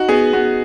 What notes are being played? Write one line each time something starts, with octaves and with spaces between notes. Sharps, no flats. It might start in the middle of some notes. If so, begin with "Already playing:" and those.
Already playing: D#4 F#4
B3 G#4
B3 F#4